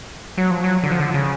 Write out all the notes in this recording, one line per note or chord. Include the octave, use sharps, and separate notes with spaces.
F#3
F3
F#3
D3
F3
D3
C#3